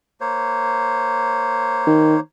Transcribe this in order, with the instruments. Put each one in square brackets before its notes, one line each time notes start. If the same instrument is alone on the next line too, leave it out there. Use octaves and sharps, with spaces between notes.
[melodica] A#3 C5 C#5
[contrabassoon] D#3